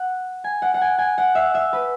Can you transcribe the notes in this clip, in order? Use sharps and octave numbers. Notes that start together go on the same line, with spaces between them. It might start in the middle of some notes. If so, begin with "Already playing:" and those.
Already playing: F#5
G#5
F#5
F#5
G#5
G#5
F#5
E5
E5
B4